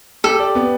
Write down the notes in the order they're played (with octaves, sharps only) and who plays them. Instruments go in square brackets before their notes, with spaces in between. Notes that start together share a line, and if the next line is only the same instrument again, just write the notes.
[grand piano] G4 [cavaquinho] A4
[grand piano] D5
B3